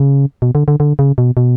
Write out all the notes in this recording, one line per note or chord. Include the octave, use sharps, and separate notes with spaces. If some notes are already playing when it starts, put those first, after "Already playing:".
Already playing: C#3
B2
D3
D3
D3
C#3
B2
B2